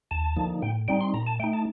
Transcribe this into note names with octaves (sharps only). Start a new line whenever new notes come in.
D#2 A5
D3 F3 A#3 D#4
A2 G5
G3 C4 D#4 G5
C6
A#2 A#5
A5
A3 D#4 G5
A5